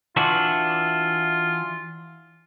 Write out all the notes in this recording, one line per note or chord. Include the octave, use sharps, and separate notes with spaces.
E3 D4 F4 F#4